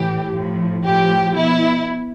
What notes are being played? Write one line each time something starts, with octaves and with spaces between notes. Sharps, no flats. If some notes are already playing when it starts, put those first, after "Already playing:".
Already playing: A2 E3 G4
A2 F3
A2 F3 G4
B2 E4